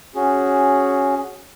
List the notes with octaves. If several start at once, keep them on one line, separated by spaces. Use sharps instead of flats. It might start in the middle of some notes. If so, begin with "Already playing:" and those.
C#4 F#4 G#4